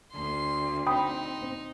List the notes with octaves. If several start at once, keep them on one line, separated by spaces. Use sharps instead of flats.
D2 C6
C4 D#4 G5 B5 D#6